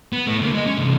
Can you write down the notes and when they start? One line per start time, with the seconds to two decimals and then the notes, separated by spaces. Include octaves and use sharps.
0.13 B3
0.27 A3 E4
0.41 D3 A#3
0.54 G#3 D#5
0.67 C#4
0.78 C3 E3